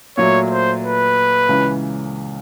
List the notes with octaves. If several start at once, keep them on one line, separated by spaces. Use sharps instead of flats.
A#2 F#3 A3 C#5
C5
B4
C#2 C#3 E3